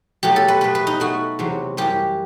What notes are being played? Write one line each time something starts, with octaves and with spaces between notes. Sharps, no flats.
B2 F#3 A3 G4
A4
B4
B2 A3 B4
B4
D#4
B2 A3 F#4
E2 C3 F#3
F#2 E3 G3 G4